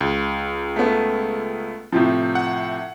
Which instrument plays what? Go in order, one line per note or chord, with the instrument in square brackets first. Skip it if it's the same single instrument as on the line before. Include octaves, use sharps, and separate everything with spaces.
[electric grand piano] C#2
[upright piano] A3 B3
A2 C3 F3
[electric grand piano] F#5